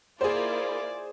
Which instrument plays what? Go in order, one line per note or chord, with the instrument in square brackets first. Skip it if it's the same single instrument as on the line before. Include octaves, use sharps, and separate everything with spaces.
[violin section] A#3 E4 F4 [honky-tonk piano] G#4 C5 [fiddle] D5